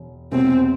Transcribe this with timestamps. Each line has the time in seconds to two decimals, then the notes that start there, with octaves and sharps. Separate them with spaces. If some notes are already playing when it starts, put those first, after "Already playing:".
Already playing: E1
0.32 E1 E2 C3 C4